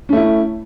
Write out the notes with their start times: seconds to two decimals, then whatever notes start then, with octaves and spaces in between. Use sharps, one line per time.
0.09 C#4
0.13 A3
0.16 E4